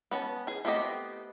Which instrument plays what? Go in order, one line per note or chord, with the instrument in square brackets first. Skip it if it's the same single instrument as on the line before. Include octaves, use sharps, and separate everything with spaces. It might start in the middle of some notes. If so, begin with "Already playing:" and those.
[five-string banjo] B3 C#4 D#5 A5
G#4 G#5
A3 B3 C4 G4 D#5